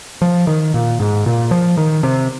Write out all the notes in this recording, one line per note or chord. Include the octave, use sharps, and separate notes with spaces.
F3
D#3
A#2
G#2
A#2
F3
D#3
C3